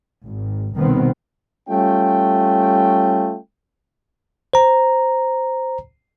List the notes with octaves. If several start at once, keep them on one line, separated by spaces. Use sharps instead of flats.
G#1
C2 B2 D#3 B3 C4
G3 A3 C#4 F4 G5
C5 A#5